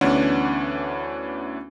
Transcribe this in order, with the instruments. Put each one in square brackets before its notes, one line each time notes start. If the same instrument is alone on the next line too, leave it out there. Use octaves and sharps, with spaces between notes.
[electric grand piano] D2 E3 B3 C#4 D4 F#5